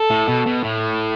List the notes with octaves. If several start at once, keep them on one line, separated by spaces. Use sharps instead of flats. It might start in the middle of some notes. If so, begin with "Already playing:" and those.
Already playing: A4
A2
B2
B2
A2